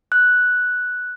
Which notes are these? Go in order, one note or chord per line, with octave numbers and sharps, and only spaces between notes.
F#6